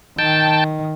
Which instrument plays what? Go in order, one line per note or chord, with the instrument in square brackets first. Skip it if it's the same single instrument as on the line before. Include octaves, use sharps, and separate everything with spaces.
[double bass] D#3 [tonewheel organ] G5 A5